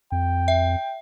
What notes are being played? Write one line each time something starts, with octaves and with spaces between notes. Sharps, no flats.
F2 G5
E5